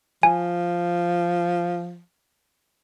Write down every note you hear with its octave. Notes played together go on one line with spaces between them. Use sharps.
F3 G#5